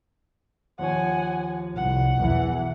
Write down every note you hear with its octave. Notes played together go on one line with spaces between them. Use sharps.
D#2 F3 C#5 F#5 G#5
C2 F#5
B1 E2 E3